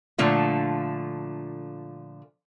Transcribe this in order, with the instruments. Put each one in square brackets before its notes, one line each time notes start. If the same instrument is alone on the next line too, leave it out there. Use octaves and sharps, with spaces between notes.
[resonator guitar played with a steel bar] A#2 D3 F3 A3